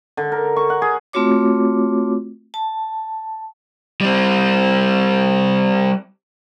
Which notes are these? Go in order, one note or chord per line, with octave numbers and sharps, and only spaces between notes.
D3
A#4
C#6
F#5
G#4
A3 C4 F4 F#4 C#5 D6
A5
G3 C4